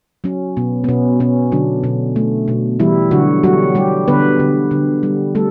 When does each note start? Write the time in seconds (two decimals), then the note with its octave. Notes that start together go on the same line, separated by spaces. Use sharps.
0.24 F#3 C#4
0.57 B2 B3
0.84 B3
0.88 B2 C#4
1.20 B2 C#4
1.52 D3 F#3 D4
1.84 B2
2.16 A3
2.48 B2
2.80 E3 G3 E4
3.11 D3 F#3 F#4
3.44 F#3 G3 F#4
3.75 G3 G4
4.08 D3 B3 B4
4.39 D3
4.71 D3
5.03 G3
5.35 G3 A3 A4